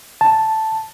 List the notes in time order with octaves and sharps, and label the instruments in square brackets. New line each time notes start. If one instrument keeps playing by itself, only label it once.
[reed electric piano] A5